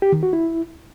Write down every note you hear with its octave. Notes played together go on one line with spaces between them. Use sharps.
G4
D#3
F#4
E4